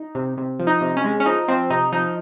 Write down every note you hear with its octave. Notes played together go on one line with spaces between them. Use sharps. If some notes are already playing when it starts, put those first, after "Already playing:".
Already playing: D#4
C3
C3
F3
D#4
C3
C#4
G#3
C#4
F3 D#4
F3 C4
C3 D#4
F3 D#4